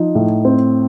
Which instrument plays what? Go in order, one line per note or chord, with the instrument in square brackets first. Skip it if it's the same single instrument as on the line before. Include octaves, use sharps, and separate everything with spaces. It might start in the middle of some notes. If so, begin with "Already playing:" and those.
Already playing: [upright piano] F3 D#4
A2
C4